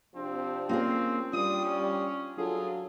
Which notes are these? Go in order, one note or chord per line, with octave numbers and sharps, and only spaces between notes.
C3 F3 C4 D4
A#3 C4 C#4 F4 G#4 F5
G3 D4 F4 D5 D#6
C#4
F#3 D4 F4 G#4 A4